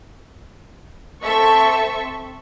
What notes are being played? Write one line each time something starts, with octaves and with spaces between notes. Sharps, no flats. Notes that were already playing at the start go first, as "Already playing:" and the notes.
C4 A4 E5 C#6